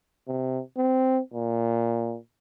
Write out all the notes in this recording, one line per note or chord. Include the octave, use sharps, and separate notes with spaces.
C3
C4
A#2